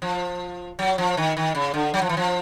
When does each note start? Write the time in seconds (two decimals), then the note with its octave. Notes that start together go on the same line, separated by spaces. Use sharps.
0.02 F3
0.79 F#3
0.98 F3
1.17 D#3
1.37 D#3
1.55 C#3
1.74 D3
1.94 F#3
2.02 F3
2.09 E3
2.17 F3